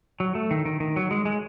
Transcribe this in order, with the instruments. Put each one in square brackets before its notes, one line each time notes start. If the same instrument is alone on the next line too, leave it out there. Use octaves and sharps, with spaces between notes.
[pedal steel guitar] F#3
A3
D#3
D#3
D#3
F#3
G#3
G#3